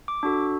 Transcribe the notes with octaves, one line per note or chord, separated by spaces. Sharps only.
D6
D4 F#4 A4